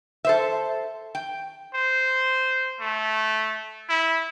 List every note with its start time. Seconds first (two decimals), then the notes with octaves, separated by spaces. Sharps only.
0.25 A4 C5 E5
1.15 G5
1.74 C5
2.80 A3
3.89 E4